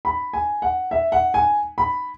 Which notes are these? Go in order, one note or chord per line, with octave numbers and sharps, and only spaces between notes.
B5
G#5
F#5
E5
F#5
G#5
B5